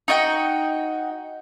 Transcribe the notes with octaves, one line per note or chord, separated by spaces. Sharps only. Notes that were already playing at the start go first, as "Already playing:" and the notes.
D#4 F#4 D#5 G5